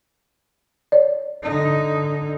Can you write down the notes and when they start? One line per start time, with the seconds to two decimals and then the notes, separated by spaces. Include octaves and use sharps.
0.92 C#5 D5
1.43 D3 D#4